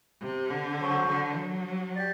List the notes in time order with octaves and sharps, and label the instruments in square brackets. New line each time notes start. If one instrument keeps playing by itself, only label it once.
[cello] C3
D3
[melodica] F#3 C4 F#4 C5
[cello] D3
F#3
[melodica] G4 D5